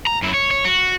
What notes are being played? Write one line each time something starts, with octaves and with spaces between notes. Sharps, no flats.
A#5
F#2 E4
C#5
C#5
F#4